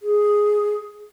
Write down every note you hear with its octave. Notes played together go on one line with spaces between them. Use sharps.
G#4